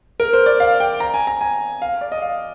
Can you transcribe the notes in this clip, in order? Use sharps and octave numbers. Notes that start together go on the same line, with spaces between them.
A#4
C5
D5
F5
G5
A#5
G#5
A#5
G#5
F5
D5
D#5
F5